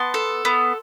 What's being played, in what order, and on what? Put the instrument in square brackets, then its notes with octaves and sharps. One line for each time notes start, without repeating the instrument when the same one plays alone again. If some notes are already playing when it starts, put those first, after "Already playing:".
Already playing: [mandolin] B3 A5 C6
A4
B3